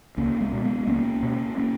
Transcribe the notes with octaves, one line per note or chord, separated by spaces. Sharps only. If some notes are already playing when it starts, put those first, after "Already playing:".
C#2 A#3 C#4
G#3 B3
B2
G#3 B3
C#2 A#3 C#4
B2
A#3 C#4